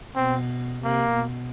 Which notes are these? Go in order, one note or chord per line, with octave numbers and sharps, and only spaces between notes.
B2 C4
C3 A#3
B2